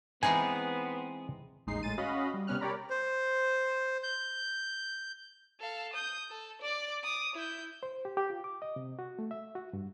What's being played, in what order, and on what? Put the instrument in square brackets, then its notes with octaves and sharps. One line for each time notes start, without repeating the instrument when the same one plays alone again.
[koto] E3 G#3 D#4 [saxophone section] B3 [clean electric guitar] C4 G#4 [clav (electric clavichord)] G#5
[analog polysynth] A1 D#2 G#3 D#4 C7
A2 G#3 A6 D#7
C#4 F#4 D#5 F5 B5
G3
C3 G3 B3 C#4 F6 F#6
G4 A#4 C#5 D5 A#5 B5
[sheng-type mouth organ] C5
G6
[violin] A4 F5
D#6 G6
A4
D5 D6
D6 D#6
E4 G6
[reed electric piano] C5
G4
G4
F4
D6
D#5
C3
F#4
A3
E5
F#4
G2